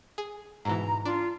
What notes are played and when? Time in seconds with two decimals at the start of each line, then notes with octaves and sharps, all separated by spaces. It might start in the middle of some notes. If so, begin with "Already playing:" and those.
0.18 G#4
0.65 G#2 B2 E3 A#5
1.06 D4 F4